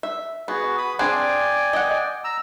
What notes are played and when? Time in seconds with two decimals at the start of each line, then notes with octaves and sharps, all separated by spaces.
0.03 E5
0.48 B3 F#4 G#4
0.78 B5 D#6
0.99 C4 D4 G#4 D5 G5 G#5
1.73 D#5 F#5
2.24 A#5 E6